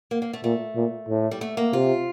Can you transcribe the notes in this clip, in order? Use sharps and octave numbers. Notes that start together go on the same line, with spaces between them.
A#3
A#3
A3
A#2 A3
A#2
A2
G3
A3
A#3
C3 F4